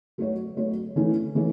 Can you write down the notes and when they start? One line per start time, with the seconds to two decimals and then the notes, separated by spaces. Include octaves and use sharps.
0.18 F#3 A3 F#4 C#5
0.56 F#3 A3 F#4 C#5
0.96 E3 A3 C#4 E4 A4
1.35 E3 A3 C#4 E4 A4